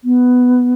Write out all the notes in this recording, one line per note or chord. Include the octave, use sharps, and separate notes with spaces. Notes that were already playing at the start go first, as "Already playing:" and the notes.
B3